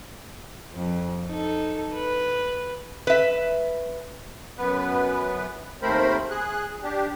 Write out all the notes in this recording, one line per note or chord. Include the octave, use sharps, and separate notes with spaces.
F2
D#4 A4
B4
B4 E5
F#2 B3 B4
D#2 A3 C4 A#4 C5 B5
G#4 F#6
D4 G4